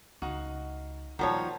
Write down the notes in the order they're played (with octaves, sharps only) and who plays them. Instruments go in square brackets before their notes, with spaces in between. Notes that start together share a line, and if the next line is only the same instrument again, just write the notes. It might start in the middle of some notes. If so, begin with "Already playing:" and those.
[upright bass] C#2 [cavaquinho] D#4 F#4 F5
[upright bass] A#2 G3 [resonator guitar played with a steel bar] D#3 F3 C#5 [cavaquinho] F#4 A#4 C5